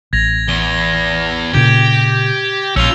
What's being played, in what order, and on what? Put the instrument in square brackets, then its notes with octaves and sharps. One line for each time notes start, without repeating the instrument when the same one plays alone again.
[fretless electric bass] A1 [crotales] G#6 A#6 F7
[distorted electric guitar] E2 [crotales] G7
[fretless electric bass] A#2 C#3 [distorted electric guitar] G4 [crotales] G6 G#6
[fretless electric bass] A#1 [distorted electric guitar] C#4 F4 [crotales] E6 F7 G7